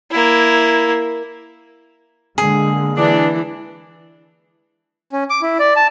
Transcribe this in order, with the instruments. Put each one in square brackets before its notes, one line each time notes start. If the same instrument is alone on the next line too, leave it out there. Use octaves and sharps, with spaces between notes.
[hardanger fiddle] A#3 E4
[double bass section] D3 G#3 A#3 [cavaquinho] G#4
[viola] E3 [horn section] D4
[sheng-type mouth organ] C#4
D6
E4
D5
A5